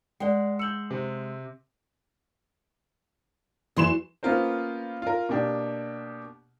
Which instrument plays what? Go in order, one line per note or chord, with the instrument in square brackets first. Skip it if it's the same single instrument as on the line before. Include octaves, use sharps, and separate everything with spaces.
[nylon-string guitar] G#3 F#5 [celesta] D5 G5
[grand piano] E6 G6 [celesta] C#7 F#7
[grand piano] C3
[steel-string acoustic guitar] E2 F#3 [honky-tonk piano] E3 C6 E7
[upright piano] A#3 B3 C#4 F4 A#4 C5
F4 A#4
B2 A#3 D4 G4